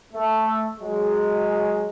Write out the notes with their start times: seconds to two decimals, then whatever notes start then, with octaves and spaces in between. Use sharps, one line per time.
0.12 A3
0.80 F#3 G#3